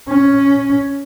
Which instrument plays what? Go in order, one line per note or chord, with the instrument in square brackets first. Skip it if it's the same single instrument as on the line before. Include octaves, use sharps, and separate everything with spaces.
[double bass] C#4